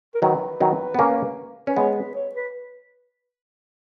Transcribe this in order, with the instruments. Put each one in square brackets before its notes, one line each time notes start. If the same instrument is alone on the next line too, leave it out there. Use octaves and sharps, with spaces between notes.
[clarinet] A#4
[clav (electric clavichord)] D#3 F#3 [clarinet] B4
[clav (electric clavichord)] D#3 F#3
B3
A#3 C#4
[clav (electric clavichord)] C#4 [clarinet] B4
[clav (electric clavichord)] G#3 B3 [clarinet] C#5
[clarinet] B4
C#5
B4